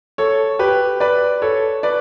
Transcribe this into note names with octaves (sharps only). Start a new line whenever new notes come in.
A4 C#5
G4 B4
B4 D5
A4 C#5
B4 D5